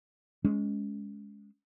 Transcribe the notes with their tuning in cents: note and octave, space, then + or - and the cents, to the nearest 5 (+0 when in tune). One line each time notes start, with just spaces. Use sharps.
G#3 +0 C#4 +20